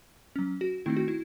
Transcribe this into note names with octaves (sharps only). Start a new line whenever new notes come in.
F#3 C#4
F#4
D#3 A3 C4 D#4 E4
F#4
E4